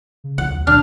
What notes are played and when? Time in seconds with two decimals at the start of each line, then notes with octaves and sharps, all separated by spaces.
0.24 C#3
0.38 C2 F3 F#5
0.51 D#2
0.67 B2 D#3 F#3 D4 F6